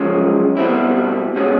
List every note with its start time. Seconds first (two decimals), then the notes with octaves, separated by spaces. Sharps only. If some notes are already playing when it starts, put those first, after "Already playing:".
Already playing: F#2 C#3 F3 G#3 C#4
0.57 B2 G3 C4 E4
1.36 B2 G#3 C#4